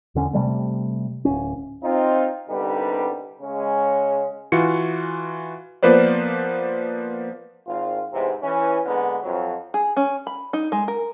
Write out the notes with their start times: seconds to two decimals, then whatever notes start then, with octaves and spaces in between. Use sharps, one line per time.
0.15 E2 D3 C#4
0.33 C3 F3 G3 A3
1.25 D1 G#1 C#4
1.83 C4 D#4 F4
2.49 C2 D3 G3 B3 D#4 B4
3.42 C#3 G#3 C#4
4.52 E3 F4 F#4 C#7
5.83 F3 A#3 B3 B4 C5 D5
7.66 G#1 F4
8.12 E2 G#2 C3
8.42 E3 C#4
8.86 D3 G#3 A#3 B3
9.23 F2 F#3
9.74 G#4
9.96 C#4
10.27 B5
10.53 D#4
10.72 G#3
10.88 A#4